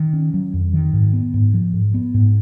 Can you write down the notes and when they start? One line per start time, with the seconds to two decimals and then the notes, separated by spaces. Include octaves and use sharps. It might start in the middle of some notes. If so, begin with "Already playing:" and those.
Already playing: D#3
0.13 C#4
0.34 F#3
0.54 F2
0.73 D#3
0.93 G#2
1.13 B3
1.34 G#2
1.54 F3
1.73 G#2
1.94 B3
2.14 G#2